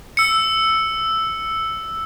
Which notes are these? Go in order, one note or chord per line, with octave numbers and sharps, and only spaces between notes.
E6 C#7